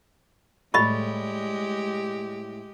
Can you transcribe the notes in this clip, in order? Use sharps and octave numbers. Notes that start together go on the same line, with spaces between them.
A2 G3 G#3 G4 A4 D#5 B5 C#6